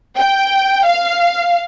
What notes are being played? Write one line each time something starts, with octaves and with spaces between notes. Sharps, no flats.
G5
F5